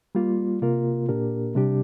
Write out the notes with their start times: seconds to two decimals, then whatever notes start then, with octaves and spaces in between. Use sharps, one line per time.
0.15 G3 A#3 F4
0.62 C3 A#3 F4 A#4
1.09 A#2 A#3 D4 G4 A#4
1.55 C3 G3 D4 G4